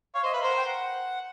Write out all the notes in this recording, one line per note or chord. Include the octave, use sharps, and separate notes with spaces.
C#5 F5
C5 D#5
B4 E5 F5
A#4 C5 F#5
G5
F#5